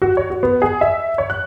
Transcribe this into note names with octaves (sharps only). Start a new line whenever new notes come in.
F#4
C#5
F#4
B3
G#4
E5
C#5
F#6